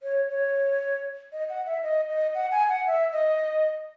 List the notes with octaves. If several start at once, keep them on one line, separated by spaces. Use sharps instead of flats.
C#5
C#5
D#5
F#5
E5
D#5
D#5
F#5
G#5
F#5
E5
D#5